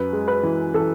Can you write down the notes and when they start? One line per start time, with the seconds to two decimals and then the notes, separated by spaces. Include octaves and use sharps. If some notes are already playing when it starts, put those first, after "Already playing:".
Already playing: F#2 B4
0.13 G#3
0.28 B4
0.43 E3
0.74 E3 A4